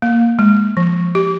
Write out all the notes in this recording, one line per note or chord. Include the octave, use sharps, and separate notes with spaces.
A#3
G#3
F3
G4